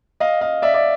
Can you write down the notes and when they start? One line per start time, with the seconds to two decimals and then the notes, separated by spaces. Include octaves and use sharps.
0.20 D#5 F5
0.41 D#5 F5
0.62 D5 E5
0.74 D5